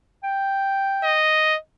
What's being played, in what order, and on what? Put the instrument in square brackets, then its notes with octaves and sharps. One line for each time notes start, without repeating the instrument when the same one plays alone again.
[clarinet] G5
[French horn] D#5